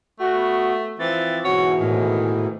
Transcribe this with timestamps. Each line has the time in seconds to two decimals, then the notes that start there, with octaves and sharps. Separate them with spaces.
0.20 A3 F#4
0.34 B3
0.99 E3 F3 C4 A6
1.44 G#2 B2 E3 F#4 C#5
1.81 A2 D#3